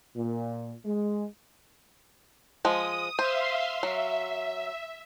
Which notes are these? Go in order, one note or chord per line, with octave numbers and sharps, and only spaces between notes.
A#2
G#3
F3 G#3 D#6
C5 E5 F5 C6
F#3 E5